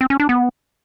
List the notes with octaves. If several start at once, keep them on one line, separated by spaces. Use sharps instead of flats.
C4
C#4
D4
B3